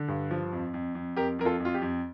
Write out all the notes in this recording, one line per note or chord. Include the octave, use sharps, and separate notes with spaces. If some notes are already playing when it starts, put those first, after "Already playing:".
Already playing: D3
G2
F3
F2
F2
F2
F2 G4 A#4
F2 A#4
F4 A4
F2
F4
G4
F2